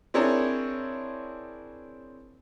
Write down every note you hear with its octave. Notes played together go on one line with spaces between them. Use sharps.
C4 D4 E4 G#4 A#4 C#5